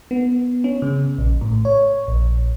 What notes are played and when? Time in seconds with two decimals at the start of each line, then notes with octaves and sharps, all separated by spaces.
0.11 B3
0.64 C#4
0.82 C#3
1.18 A#1
1.41 A2
1.65 C#5
2.08 A#1